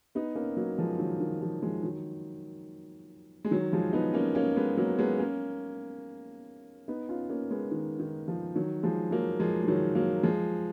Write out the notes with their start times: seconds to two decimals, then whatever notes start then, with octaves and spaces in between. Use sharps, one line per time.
0.15 B3 D#4
0.35 A#3 C#4
0.57 F#3 A#3
0.78 F3 G#3
0.99 D#3 F#3
1.20 D#3
1.41 F3
1.62 F3 G#3
1.83 D#3 F#3
3.45 G#3
3.51 D#3 F#3
3.73 F3 G#3
3.93 B3 D#4
4.14 A#3 C#4
4.35 A#3 C#4
4.56 G#3 B3
4.77 F#3 A#3
4.99 G#3 B3
5.19 A#3 C#4
6.88 B3 D#4
7.09 C#4 F4
7.29 A#3 C#4
7.51 G#3 B3
7.71 D#3
7.99 D#3
8.28 F3
8.55 D#3 F#3
8.83 F3 G#3
9.11 F#3 A#3
9.40 F3 G#3
9.63 G#3
9.68 D#3 F#3
9.95 F#3 A#3
10.23 F3 G#3